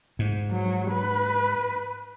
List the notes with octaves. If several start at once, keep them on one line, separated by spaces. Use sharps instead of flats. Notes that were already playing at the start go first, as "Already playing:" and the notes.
G#2
F#3
B4